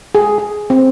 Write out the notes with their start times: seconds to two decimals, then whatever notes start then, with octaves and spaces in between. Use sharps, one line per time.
0.15 G#4
0.38 G#4
0.70 C4